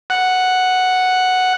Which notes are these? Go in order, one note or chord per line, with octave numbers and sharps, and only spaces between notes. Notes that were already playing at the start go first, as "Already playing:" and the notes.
F#5